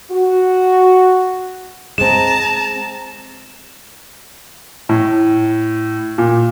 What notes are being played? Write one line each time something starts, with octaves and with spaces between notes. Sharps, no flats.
F#4
G#3 C4 A5 A#5 E7
A2
A#2